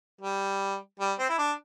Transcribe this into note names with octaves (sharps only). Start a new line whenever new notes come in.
G3
G3
C4
E4
D4